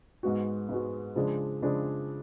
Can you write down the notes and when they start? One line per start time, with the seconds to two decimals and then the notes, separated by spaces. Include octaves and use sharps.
0.23 G#2 G#3 B3 F#4
0.69 G#2 G#3 B3 F#4
1.16 C#3 F3 G#3 D4 G#4
1.62 C#3 F3 G#3 D4 G#4